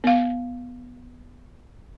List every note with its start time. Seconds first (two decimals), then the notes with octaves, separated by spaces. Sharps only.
0.04 B3 F5